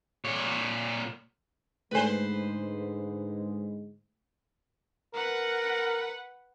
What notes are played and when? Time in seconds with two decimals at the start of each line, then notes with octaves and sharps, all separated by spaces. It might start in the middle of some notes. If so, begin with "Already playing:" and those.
0.24 A#2 C#5
1.91 G#2 D3 G#3 A3 A4 B4 C5 G#5
5.14 A#4 B4 F#5